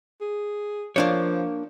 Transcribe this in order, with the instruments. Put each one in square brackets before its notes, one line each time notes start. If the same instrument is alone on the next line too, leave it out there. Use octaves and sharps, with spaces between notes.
[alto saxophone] G#4
[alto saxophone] F3 [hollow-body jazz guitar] A#3 D4 C#5